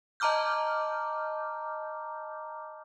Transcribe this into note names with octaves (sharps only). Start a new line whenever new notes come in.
D#5 A5 A#5 D6 F6 G6